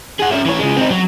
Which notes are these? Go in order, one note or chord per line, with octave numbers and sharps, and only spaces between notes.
G#4 F#5
C#4 E5
E3 C#5
C#3 G#3
C4 D#4
F#3